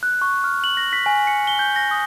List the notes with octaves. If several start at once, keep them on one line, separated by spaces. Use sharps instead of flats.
F#6
C#6
F6
F#7
A#6
B6
G#5
C#7
G7
G6
A#6
D#6